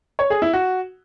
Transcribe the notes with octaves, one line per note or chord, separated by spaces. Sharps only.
C#5
G#4
E4
F#4